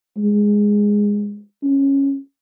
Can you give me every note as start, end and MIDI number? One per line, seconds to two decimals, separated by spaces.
0.18 1.41 56
1.63 2.17 61